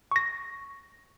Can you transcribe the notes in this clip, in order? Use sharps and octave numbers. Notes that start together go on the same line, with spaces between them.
C#6 A#6